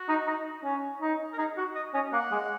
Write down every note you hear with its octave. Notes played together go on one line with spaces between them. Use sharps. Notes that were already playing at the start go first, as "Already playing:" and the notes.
Already playing: F#4
D#4
D#4
C#4
D#4
A#4
D#4 G#4
F#4 F#5
D#5
C#4 D#5
A#3 F#5
G#3